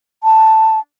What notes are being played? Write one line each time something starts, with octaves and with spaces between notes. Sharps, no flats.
A5